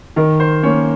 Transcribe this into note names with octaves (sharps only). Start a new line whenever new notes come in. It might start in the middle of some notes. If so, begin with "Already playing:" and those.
D#3 A#4
C5
A#3 C#4 C#5